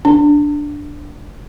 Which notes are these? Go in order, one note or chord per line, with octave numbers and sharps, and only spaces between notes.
D4